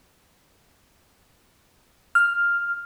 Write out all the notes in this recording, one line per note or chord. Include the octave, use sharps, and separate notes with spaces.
F6